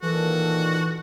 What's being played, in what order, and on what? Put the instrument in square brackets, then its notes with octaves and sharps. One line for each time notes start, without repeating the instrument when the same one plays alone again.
[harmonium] A#2 D#3 A4 [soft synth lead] E3 [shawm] F#4